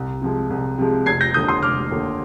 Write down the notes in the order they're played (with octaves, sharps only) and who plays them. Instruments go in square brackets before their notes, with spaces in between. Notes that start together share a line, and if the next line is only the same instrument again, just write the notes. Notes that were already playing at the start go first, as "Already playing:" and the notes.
Already playing: [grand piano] C2
C3 F3 G#3
C2
C3 F3 G#3
F1 G#6 C7
G6 A#6
D#2 D3 D#6 G6
C6 D#6
F1 D6 F6
D#2 D3